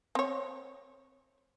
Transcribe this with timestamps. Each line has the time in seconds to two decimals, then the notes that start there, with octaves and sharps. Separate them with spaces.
0.15 C4 C#5